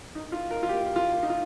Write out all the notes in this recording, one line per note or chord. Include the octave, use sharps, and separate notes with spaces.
D#4
F4
A#4
F4
G4
F4
D#4
F4